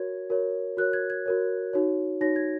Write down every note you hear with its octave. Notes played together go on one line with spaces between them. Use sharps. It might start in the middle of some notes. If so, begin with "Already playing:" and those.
Already playing: F#4 A#4 C#5 G#6
F#4 A#4 C#5
F#4 A#4 C#5 F#6
G#6
G#6
F#4 A#4 C#5
D#4 F#4 C#5
D#4 F#4 C#5 A#6
G#6